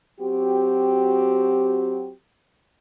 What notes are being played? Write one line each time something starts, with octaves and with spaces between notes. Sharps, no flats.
F#3 C4 F#4 G4